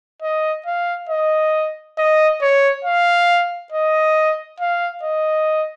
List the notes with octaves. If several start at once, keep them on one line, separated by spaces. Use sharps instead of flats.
D#5
F5
D#5
D#5
C#5
F5
D#5
F5
D#5